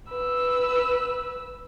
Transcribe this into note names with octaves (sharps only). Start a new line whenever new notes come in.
B4 E6